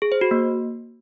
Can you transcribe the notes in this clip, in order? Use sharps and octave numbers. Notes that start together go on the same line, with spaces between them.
G#4
C5
F#4
A#3